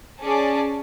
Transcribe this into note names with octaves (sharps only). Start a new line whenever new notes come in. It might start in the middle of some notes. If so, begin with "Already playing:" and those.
C#4 G#4 D5 A5